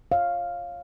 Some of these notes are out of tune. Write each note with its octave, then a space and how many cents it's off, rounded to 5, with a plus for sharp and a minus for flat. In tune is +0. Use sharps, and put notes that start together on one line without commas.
C#5 -15 F5 +0